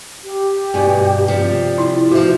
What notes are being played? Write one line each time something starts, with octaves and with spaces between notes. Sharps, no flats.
G4
G2 B2 G#5
C3 F3 D5
E4
B2 F3 F#4 C5 E5